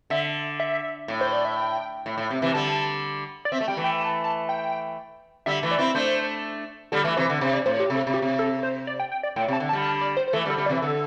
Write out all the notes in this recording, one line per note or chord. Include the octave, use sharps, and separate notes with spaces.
D3 E5
E5
A2
C5
D5
E5
G5
A2
A2
C3
C3 E3
D3 G3 A5
D5
C4 E5
A3
G3 G5
E3 A3
G5
A5
A5
G5
D3 G3 E5
E3 A3
D5
C4 E4
A3 D4 C5
D3 G3 A4
E3 A3
C3 E3 C5
D3
C3 C5
D5
A2 C5
G4
C3 A4
C3
G4
C3
A4
C5
D5
G5
G5
D5
A2 G5
C3
A5
D3
A5
D3 G3
A5
D5
C5
C5
E3 A3 A4
D3 G3
A4
D3 G3
D5
C3 E3
D3 A4